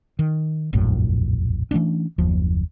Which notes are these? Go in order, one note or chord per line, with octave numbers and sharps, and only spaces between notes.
D#3
E1 A#1 F#2 A2
E3 A3 C#4 D4
F#1 D#2 F3